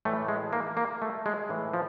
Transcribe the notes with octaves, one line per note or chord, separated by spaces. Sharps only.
A2 E3 A3
G#3
A#3
A#3
A3
G#3
A2 E3
F3